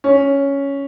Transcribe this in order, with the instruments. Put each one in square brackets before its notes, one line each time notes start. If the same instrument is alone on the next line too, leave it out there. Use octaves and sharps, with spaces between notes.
[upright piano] C#4